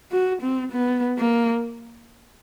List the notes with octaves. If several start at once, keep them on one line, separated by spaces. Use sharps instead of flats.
F#4
C4
B3
A#3